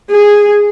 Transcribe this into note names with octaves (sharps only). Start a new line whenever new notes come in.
G#4